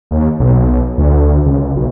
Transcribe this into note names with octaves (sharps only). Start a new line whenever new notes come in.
D#2
B1
D2
C#2
B1